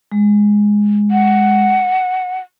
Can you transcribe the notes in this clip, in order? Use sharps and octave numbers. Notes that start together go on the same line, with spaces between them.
G#3
F#5